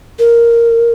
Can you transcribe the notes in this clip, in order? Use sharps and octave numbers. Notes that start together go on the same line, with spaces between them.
A#4